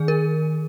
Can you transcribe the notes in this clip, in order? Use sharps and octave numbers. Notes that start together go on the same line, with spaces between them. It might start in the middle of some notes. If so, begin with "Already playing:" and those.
Already playing: D#3 G#4
A#4